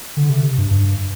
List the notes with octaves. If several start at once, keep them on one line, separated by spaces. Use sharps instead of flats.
D3
C3
G2
G2